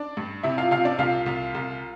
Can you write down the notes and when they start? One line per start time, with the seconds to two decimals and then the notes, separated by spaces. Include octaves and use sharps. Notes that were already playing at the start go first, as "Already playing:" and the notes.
Already playing: D4 D5
0.17 G2
0.43 C3 E4 E5
0.58 F4 F5
0.71 C3 F4 F5
0.85 D4 D5
0.98 C2 F4 F5
1.26 C2
1.55 C2